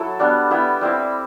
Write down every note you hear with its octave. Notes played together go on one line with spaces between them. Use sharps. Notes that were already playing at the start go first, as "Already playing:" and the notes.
Already playing: F#3 E4 A4
G3 B3 D4
G3 B3 E4
G3 C4 E4